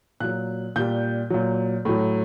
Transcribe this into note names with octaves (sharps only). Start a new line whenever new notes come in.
A#2 F#3 F#6
A#2 G3 G6
A#2 F#3
A2 F#3